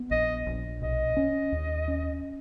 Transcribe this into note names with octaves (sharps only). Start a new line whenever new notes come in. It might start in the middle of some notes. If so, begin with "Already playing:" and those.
Already playing: B3
A#1 D#5
A#1
B1 D#5
C#4
D#2
C#4